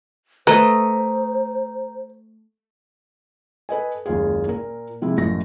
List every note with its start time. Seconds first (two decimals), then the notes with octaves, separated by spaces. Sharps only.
0.47 A3 B4 C5 D#5 A#5
3.69 A4 B4 D#5 G#5
4.06 F#1 D#2 G#3 F4 G#4
4.47 A#2 A#4
5.02 C3 F3 G#3 E4
5.17 A1 F#2 F3 A3 A#6